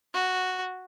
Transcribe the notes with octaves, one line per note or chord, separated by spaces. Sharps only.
F#4